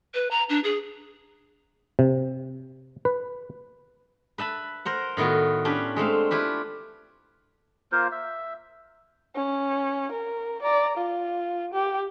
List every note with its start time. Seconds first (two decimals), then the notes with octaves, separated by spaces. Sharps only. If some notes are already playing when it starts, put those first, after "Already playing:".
0.14 B4
0.31 A#5
0.49 D4
0.64 G#4
1.99 C3
3.05 B4
4.38 B4 E5 A5 B5
4.85 A#4 C5 F#5
5.17 A2 D#3 B3 F4 F#4
5.65 C#4 D4 G4 B4
5.96 G#3 A3 C4 F5
6.31 E4 F4 G4 B4
7.92 A#3 F4 A#4 C5
8.12 E5
9.36 C#4
10.12 A#4
10.62 D5 A#5
10.97 F4
11.73 G4